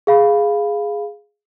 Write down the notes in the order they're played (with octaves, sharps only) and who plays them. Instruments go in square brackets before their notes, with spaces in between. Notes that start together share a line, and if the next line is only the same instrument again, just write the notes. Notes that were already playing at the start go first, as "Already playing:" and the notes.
[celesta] G#4 F5 B5